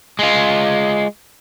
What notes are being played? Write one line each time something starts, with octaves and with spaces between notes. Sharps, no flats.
G#3 F4